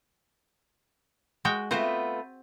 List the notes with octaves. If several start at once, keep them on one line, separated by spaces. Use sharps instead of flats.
G#3 F#4 G5
A3 B3 C4 F4 F#4 C5